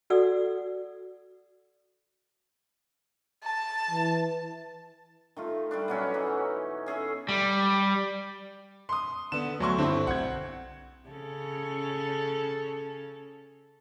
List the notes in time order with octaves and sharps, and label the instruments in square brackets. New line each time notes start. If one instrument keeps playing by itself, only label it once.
[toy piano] F#4 A4 D5 F#5 E6
[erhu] A5
[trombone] E3
[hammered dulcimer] D#3 A3 F4
G3 A3 D4
B2 F#3 C#4
E3 D#4
C#4 G#4 A4 E5
[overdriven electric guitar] G3
[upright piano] C6 D#6
[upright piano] D3 B3 [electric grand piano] E7
[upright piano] D2 C6 C#6 [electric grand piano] F#3
[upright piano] G2 [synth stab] D3 E4 [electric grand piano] C4
[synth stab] B1 [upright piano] F#5 G#6
[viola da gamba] C#3 C#4 A4